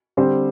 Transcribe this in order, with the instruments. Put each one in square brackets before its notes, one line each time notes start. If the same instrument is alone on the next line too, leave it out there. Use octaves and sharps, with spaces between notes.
[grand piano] D3 G3 C4 G4 C5